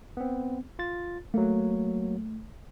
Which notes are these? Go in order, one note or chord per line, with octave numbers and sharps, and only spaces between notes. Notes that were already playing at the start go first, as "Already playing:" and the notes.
B3 C4
F4 A6
F#3 A3 A#3